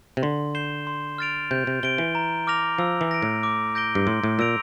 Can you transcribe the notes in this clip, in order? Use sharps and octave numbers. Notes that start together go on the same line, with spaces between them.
C3
D3 C6
G6 C7 E7 G7
C6
F6 A6 D7 F7
C3 G6
C3
C3 D7 G7
E3
A#5
D6 F6 A#6 F7
F3 E6
E3
A#6 D7
A2
D6
G6 A#6 D7 G7
G2
A2 C6
A2
A#2 E6 A#6 D7 F7